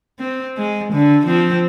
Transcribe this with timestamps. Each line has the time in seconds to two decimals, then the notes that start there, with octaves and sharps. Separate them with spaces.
0.19 C4
0.57 G#3
0.93 D3
1.26 F3 C4